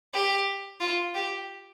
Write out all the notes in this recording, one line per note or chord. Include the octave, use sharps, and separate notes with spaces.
G4
F4
G4